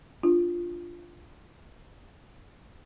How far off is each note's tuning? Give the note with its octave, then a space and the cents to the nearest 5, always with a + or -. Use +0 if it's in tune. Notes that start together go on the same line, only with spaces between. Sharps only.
D4 +0 F4 +0